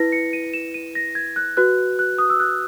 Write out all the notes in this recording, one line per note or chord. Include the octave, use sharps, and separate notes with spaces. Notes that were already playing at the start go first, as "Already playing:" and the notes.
Already playing: E4 B4 A#6
C#7
D#7
E7
D#7
A#6
G#6
F#6
F#4 B4 F#6
F#6
D#6
E6
F#6